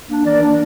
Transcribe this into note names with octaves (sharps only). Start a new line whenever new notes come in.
A#3 D4
E3 A#4 D5
A#3 D4